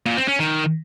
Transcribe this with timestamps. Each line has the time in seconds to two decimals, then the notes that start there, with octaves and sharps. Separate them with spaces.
0.06 A#2
0.17 C4
0.28 C#4
0.39 D#3